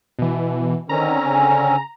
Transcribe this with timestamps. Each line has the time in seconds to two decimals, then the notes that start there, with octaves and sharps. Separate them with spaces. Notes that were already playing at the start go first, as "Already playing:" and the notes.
0.19 B2 E3
0.89 D3 D#3 C4 C#4 A#5
1.25 C#3 G#5